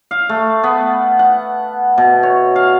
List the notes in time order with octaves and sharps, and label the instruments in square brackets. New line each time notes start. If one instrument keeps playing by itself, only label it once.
[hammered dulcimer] F5
A3
B3
F#5
B2
C#5
F5